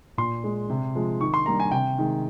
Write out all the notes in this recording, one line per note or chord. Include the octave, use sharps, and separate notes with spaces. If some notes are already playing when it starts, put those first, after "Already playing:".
A#2 C6
G#3
C3
F3 G#3
D#3 C#6
C6
G3 A#3 A#5
G#5
C3 G5
D#3 G#3